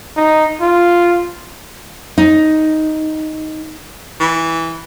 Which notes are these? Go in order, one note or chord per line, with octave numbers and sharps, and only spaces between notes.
D#4
F4
D#4
E3